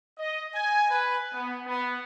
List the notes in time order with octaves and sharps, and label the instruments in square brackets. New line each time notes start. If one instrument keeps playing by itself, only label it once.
[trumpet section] D#5
G#5
B4
B3
B3